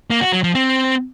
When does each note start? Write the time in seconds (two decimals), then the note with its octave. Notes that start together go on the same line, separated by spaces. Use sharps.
0.10 A#3
0.21 F#4
0.33 F#3
0.44 F3
0.55 C4